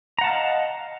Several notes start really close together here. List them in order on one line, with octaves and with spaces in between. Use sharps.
A#5 F#5 A5 F5 D#5